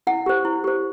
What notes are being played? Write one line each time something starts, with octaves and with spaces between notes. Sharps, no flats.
E4 F#5
G4 C5
E4
G4 C5